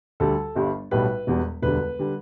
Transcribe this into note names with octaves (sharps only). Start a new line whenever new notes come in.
D2 D3 G3 A4
G1 G2 G3
B1 A2 G3 B4
E1 E2 B2 G3
E1 D2 D3 G3 B4
D3 G3